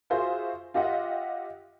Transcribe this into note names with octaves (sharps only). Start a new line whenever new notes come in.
F4 F#4 G#4 C5 E5
F4 G4 D#5 E5 F#5